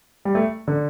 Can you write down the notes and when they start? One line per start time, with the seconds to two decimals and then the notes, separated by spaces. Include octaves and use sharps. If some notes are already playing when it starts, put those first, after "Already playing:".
0.25 G3
0.35 A3
0.68 D3